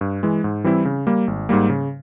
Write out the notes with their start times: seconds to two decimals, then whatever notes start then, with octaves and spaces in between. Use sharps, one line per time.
0.01 G2
0.23 E3 G#3
0.44 G#2
0.64 E3 G3 C4 E4
0.85 C#3
1.07 G3 A#3
1.27 G#1
1.49 G#2 G3 A#3
1.70 C#3